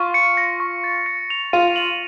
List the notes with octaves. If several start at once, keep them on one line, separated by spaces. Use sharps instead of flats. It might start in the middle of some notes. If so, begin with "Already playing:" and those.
Already playing: F4 C#6
C#7
A#6
C#6
A6
C#7
F7
F4 D#7
F#7